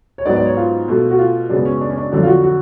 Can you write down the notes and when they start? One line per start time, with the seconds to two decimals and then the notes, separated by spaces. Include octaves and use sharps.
0.18 C#5
0.26 G#2 F#3 B3 D5
0.36 D5
0.46 C#5
0.57 F4
0.88 B2 A3
1.10 F#4
1.19 F4
1.50 F#2 C#3 G#3 B3 D4
1.65 C#4
1.81 D4
1.90 C#4
1.98 D4
2.12 F2 D3 F#3 D4
2.23 F4
2.28 F#4
2.43 F#4